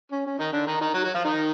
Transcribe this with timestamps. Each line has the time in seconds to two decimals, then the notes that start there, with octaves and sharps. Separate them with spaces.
0.12 C#4
0.27 C#4
0.39 D#3 D#4
0.53 D3 D4
0.67 D#3 D#4
0.81 D#3 D#4
0.94 F#3 F#4
1.04 F#3 F#4
1.15 F3 F4
1.24 D#3 D#4